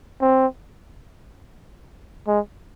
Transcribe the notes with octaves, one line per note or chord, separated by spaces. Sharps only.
C4
G#3